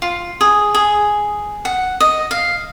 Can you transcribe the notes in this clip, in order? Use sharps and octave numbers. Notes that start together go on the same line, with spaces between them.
F4
G#4
G#4
F#5
D#5
F5